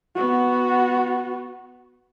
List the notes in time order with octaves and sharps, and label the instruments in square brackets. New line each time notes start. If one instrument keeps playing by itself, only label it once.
[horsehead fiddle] B3 F#4